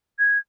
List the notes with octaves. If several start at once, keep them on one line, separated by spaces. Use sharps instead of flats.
G#6